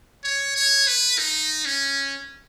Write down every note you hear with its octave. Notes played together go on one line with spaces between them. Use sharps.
C#5
C#5
B4
D#4
C#4